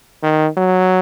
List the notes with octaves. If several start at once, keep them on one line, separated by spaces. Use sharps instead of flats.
D#3
F#3